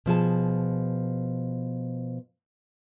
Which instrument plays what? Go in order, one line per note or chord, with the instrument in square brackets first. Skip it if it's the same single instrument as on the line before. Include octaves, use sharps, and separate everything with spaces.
[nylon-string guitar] B2 F3 G#4 A5